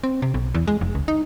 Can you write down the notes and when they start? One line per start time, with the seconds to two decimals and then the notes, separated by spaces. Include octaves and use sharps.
0.04 C4
0.22 C3
0.34 B1
0.55 E2
0.68 G#3
0.81 F1
0.95 C#2
1.08 D#4